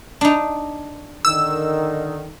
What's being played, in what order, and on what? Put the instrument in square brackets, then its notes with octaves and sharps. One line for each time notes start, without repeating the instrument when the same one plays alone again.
[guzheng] D4 D#4
[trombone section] D3 D#3 [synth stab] E6